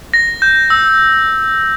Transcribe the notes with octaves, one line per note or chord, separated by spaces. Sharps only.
A#6
G6
E6